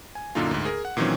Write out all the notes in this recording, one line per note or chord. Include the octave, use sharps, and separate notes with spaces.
G#5
F#2 A#2 D3 A#3 D#4 F4
D2 G#2
G#4 A#4
F#5
A#2 D#3 E3 F#3 C4 C#4